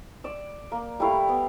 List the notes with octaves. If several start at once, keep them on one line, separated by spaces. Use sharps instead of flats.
D5 E6
A#3
G3 A3 E4 F5
B3